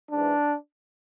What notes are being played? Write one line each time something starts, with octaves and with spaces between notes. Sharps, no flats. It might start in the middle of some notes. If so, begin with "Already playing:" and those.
G#2 E3 D4